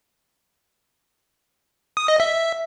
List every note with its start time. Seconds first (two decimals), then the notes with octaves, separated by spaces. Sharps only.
1.97 D#6
2.08 D#5
2.20 E5